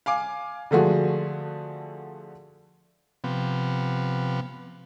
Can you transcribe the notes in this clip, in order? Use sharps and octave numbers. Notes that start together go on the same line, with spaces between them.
F5 G#5 D6
D3 F3 A3 F#4 G#4
C3 F3 B3